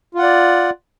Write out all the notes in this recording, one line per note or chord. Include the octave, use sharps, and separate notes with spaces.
F4 D5 F#5